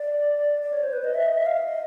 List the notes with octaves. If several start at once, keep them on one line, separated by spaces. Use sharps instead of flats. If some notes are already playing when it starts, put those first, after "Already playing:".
Already playing: D5
D5
C#5
C5
B4
D#5
E5
D#5
E5
F5
E5
D#5